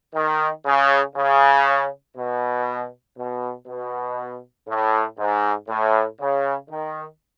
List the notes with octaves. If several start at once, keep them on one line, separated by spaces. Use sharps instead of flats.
D#3
C#3
C#3
B2
B2
B2
A2
G#2
A2
C#3
D#3